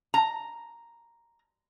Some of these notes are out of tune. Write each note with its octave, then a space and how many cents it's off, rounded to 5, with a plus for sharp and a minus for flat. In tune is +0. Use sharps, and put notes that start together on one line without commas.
A#5 +0